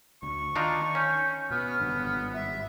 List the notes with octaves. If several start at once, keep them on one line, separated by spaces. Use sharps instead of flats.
D2 C#6
D#3 D4 D#4 F4
C#4 G6
B2 B3 F6
G#1 G2 D3
E5